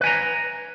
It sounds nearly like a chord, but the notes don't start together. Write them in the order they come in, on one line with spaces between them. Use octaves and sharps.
B4 G#5 A#5